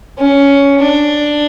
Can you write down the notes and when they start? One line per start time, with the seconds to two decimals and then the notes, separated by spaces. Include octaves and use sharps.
0.18 C#4
0.80 D4